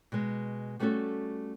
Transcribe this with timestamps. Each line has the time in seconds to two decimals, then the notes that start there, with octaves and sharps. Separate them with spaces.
0.12 B2 G#3
0.79 G3 A3 B3 C#4 F#4 A4